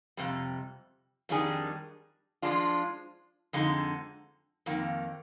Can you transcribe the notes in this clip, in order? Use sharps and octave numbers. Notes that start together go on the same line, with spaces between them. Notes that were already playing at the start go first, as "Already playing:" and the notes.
F2 C3 G3
F2 D#3 G3 D4 G#4
F3 G#3 D4 F4
F2 D3 G#3 D#4
F2 D#3 A#3